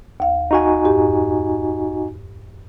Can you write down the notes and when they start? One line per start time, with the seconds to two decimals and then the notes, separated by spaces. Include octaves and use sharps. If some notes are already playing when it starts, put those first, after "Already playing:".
0.20 D#2 F5
0.51 D#4 F#4 G#5
0.85 F2 G#2 G4